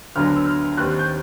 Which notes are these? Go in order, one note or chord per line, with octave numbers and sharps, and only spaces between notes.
D2 D3 F#3 B3 F6
E6
F6
D#2 D#3 G3 C4 F#6
G6